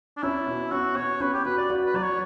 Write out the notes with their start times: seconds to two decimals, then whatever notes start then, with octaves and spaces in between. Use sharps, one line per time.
0.17 D4
0.23 C#4 E4
0.47 B2
0.72 C#4 F#4
0.96 B2 C#5
1.20 C#4 B4
1.33 G4
1.45 F#4 B4
1.58 D5
1.70 F#4
1.86 B4
1.94 F#3 D5
2.03 C#5